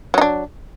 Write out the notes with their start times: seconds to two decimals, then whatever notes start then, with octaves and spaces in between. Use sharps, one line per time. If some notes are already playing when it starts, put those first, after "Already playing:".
0.14 F#3
0.18 D#4
0.21 D4